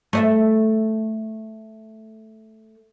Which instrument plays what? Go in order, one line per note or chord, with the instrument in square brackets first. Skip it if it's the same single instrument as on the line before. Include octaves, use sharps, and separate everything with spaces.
[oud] A3 D#5 E5